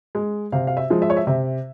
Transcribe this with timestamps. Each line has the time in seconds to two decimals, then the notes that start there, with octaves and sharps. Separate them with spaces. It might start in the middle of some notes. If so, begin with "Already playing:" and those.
0.15 G#3
0.52 C3 F5
0.67 F5
0.77 E5
0.90 F3 G#3
1.02 E5
1.10 C#5
1.17 E5
1.27 C3 E5